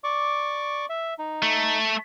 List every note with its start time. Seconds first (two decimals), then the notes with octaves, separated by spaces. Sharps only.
0.04 D5 C#6 D6
0.89 E5
1.19 D#4
1.42 A3